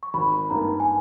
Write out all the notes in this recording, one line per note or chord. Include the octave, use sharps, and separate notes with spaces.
C#6
G#1 B5
G2 D#3 A#3 A#5
G#5